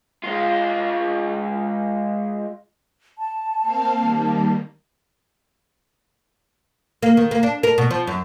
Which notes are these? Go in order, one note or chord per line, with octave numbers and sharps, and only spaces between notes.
G#3 F4
A5
A#3 C4 F5
D#3 G3 A#3
A#3
D#3
A#3
D4
A#4
B2
F3
F#2